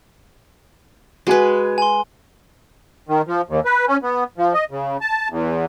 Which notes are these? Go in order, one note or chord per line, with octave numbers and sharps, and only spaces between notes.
G#3 F#4 B4 G#5
G#5 C6
D#3
F3
D#2
B4
C#4
B3
F3
D#5
C#3
A5
E2